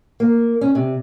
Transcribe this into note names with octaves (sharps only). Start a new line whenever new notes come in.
A#3
C#4
C3